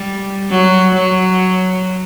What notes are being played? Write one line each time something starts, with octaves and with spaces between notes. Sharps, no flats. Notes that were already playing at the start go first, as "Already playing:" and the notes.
Already playing: G3
F#3
F#3